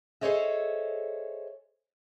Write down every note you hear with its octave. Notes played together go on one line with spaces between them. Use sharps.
G#4 A4 C5 C#5 D#5 E5